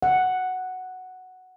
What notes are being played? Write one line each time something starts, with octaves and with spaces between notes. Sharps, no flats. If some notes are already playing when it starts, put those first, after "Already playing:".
F#5